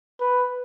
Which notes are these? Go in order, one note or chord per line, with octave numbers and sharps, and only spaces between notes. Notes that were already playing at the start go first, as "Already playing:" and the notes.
B4